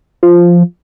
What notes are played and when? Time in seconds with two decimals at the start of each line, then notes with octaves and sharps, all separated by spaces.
0.23 F3